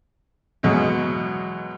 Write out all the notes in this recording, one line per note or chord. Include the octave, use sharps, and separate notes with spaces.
E2 B2 F#3 G#3